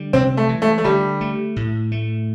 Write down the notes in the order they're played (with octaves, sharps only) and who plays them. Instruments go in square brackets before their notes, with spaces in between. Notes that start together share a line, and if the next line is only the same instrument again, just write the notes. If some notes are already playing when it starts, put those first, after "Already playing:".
Already playing: [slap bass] D3 G3
[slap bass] C3 [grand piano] C4
[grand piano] A3
[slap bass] E3
[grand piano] A3
A3
[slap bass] D3 [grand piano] G3
[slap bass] A3
A2
A3